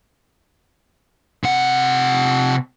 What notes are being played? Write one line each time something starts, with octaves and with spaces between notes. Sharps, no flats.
C3 F#5